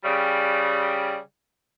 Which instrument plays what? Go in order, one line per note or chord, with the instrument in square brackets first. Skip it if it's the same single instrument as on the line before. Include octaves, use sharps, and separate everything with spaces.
[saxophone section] C#3 G3